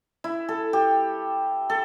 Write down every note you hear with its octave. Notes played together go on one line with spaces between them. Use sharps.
E4
A4
G4
A4